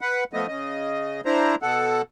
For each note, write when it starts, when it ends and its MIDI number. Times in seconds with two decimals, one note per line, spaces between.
0.01 0.24 71
0.01 0.24 78
0.33 0.47 53
0.33 0.47 57
0.33 0.47 59
0.33 0.47 75
0.48 1.21 49
0.48 1.21 75
1.25 1.55 62
1.25 1.55 64
1.25 1.55 72
1.25 1.55 82
1.62 2.02 47
1.62 2.02 69
1.62 2.02 78